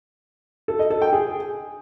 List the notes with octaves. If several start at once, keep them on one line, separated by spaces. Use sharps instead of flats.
A4
D#5
A4
G5
G#4